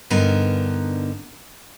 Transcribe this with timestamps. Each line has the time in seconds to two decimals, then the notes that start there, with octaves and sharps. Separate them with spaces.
0.10 G2 D3 B3 D#4 A#4